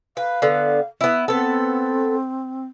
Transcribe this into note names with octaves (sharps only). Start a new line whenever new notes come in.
B4 F5
D3 B3
B3 E4
B3 C4 A4